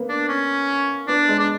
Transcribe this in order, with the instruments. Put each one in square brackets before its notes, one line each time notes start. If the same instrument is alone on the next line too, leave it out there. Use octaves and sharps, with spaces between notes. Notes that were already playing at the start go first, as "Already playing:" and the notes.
Already playing: [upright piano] A#3 B3
[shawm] D4
C#4
[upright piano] B3 [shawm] D4
[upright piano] G#3
[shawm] D4